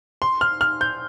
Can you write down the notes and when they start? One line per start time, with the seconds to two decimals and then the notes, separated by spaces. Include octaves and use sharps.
0.22 C6
0.41 F6
0.61 F6
0.81 G6